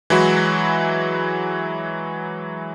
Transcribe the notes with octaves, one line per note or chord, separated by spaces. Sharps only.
E3 F#3 G#3 E4 F#4